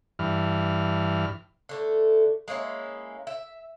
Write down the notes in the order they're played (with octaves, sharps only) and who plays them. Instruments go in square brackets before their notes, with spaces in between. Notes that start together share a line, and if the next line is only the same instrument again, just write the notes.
[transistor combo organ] G2 E3 F6
[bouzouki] D3 A3
G#3 A#3 C#4 E4
E5